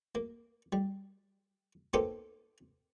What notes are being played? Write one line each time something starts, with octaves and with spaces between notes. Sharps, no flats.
A#3
G3
A#3 B3 D#4 G4 A4 C5